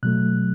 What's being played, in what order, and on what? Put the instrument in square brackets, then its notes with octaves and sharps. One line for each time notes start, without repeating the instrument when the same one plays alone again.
[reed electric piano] B2 F#3 A3 F#6